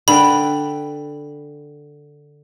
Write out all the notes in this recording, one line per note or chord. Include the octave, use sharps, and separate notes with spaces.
D3 B4 G5 B5